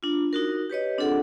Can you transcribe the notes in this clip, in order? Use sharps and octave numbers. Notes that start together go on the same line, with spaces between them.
D4 F4
D#4 F#4 A#4
G4 B4 C#5 D#5
C4 D4 F4 G#4 A4 F#5